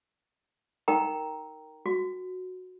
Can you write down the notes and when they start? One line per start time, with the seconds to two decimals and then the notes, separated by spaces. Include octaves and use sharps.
0.88 D#4 A#4 G5 A#5
1.86 F#4